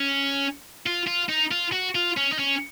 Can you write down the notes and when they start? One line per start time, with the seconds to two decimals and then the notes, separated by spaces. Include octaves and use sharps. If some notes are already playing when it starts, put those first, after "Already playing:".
Already playing: C#4
0.86 F4
1.07 F4
1.29 D#4
1.52 F4
1.73 F#4
1.95 F4
2.17 C#4
2.33 D#4
2.39 C#4